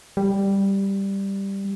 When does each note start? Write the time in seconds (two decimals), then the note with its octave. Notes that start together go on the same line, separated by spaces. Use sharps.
0.17 G3